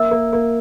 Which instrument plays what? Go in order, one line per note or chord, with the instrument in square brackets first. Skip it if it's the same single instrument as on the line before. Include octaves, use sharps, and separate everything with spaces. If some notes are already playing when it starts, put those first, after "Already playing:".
Already playing: [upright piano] A#3 [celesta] E5 E6
[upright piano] A#3
A#3